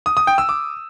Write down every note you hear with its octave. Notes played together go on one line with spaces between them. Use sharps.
D#6
D#6
G5
E6
D6